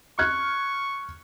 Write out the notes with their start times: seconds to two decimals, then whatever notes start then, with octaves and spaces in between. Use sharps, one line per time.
0.19 C#6 F6 F#6 G#6